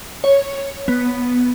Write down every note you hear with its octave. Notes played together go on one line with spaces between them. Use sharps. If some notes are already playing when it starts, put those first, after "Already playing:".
C#5
B3